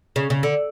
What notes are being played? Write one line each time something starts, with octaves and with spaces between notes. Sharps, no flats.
C#3
C#3
D3